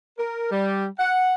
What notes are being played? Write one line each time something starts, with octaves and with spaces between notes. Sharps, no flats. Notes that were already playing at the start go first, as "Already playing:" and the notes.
A#4
G3
F#5